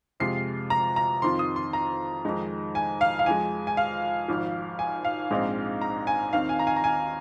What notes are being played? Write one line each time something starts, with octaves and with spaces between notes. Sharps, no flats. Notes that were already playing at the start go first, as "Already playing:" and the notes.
F2 C3 G#3 F4 C7
A#5
A#5
F2 D#3 C4 F4 C6
D#6
C6
A#5
F2 D#3 G#3 D#4
G#5
F5
F5
F2 F3 G#3 G#5
G#5
F5
G#1 G#2 F3
G#5
F5
A#1 G#2 G#3 C4 D#4
A#5
G#5
D#2 D#3 C4 D#4 F5
G#5
A#5
G#5
A#5
G#5